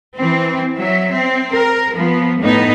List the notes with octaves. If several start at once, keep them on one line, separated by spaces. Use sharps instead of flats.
E3 C4
F#3 E5
C4
A#4
F3 B3
A2 B3 D#4